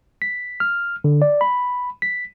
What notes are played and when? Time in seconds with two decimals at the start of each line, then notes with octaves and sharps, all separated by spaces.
0.22 B6
0.60 F6
1.04 D3
1.22 D5
1.41 B5
2.02 B6